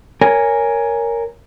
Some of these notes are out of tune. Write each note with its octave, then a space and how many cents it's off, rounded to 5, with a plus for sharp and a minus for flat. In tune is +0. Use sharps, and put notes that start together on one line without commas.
A#4 +0 C#5 +15 G#5 -5